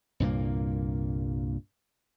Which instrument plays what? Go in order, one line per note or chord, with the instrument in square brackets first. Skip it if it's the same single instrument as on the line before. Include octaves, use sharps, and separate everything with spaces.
[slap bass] C2 G2 A#2 A#3